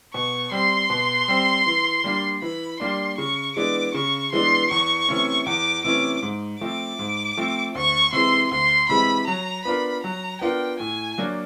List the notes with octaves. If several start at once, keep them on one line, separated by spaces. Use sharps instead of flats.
B2 C#6
G3 C4 C6
B2
G3 C4
E3
G3 A#3 D4
E3 B5
G3 A#3 D4 C6
C#3 C#6
E3 G#3 B3 D4 D6
C#3 C#6
E3 G#3 B3 D4 C6
E2 C#6
C3 E3 A3 C#4
E2 D6
C3 E3 A3 C#4 D6
G#2
F3 A3 C4 D6
G#2
F3 A3 C4
D2 C#6
C3 E3 G#3 C6
D2 C6
C3 E3 G#3 B5
F#3 A#5
B3 D4 F4 A#4 B5
F#3 A#5
B3 D4 F4 A#4 G5
A2 G#5
F#3 A#3 D4